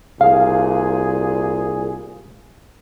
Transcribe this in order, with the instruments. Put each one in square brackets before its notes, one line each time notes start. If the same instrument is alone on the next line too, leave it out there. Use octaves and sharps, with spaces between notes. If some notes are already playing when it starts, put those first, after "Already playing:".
[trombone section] C2 A#2 G#4 [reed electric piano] F5